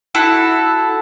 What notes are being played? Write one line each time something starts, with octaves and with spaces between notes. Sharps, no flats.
E4 F#4 A4